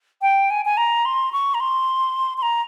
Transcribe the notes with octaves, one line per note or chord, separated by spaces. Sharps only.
G5
G#5
G#5
A#5
C6
C#6
A#5
C6
C6
A#5